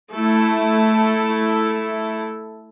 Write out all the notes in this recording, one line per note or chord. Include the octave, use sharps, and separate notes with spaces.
A3 E4 A4